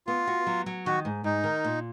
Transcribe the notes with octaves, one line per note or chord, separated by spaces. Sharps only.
B3 F4
F#4
F#3
F#3
D#3 F#4
G#2
G#2 D#4
D#3
A#2